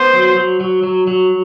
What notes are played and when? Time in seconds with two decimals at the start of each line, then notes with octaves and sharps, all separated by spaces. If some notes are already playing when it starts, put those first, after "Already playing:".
Already playing: B3 C5
0.14 F#3
0.36 F#3
0.60 F#3
0.83 F#3
1.07 F#3